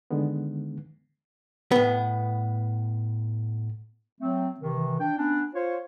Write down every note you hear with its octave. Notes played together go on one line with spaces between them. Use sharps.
D3 D#3 G#3 B3
A2 B3
F#3 A3 C4
C3 D#3 E3
D4 G5
B3 C#4 D4
F4 C5 C#5